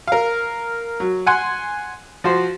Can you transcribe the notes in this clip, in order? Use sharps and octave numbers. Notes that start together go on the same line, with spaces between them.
A#4 F5
F#3
F#5 G#5 C6 F#6
F3 F#4 C5